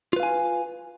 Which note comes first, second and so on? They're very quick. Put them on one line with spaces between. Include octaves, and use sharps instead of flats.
F4 B4 F5 G#5